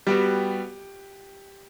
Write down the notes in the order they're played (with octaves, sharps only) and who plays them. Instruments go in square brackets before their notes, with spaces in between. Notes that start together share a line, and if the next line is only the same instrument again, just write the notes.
[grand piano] G3 B3 F#4 [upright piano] G4